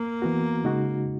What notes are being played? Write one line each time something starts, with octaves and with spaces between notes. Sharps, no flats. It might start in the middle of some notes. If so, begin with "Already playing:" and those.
Already playing: A#3
E3 B3 F#4
C#3 G#3 D#4 F#4